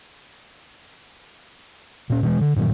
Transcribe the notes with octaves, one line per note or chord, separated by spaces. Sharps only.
A#2 C#4
B2 E3 G#3
D3
G2 A#2 D#3 F#3